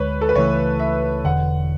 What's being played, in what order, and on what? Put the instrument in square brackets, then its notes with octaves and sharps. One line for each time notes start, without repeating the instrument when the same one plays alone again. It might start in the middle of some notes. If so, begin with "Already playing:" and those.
Already playing: [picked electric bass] D2 D3 G#3 [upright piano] B4 C#5
[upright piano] A4
B4
[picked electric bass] C#2 C#3 E3 A3 [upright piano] C#5
[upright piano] E5
[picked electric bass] E1 E2 D3 [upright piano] F#5